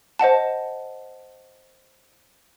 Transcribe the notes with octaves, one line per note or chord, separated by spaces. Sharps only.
C5 D#5 F#5 A5